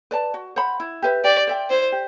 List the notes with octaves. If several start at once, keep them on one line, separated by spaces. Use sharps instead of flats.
B4 D5 A5
F#4
C5 F#5 B5
E4
G4 B4 E5
G4 D5
C5 E5 G5
E4 C5
G4